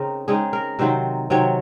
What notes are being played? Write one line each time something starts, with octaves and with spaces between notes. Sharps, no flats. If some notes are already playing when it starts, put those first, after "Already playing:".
Already playing: C#3 C4 D#4 A#4
C#3 G#3 C4 D#4 G#4
A#4
C3 D#3 F#3 C4 C5
C3 D#3 F#3 C4 C#5